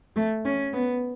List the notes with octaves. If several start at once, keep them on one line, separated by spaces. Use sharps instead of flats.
A3
C#4
B3